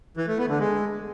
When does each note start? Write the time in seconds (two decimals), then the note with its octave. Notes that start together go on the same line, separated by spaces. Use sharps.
0.17 E3
0.28 A3
0.38 B3
0.49 D3
0.59 G#3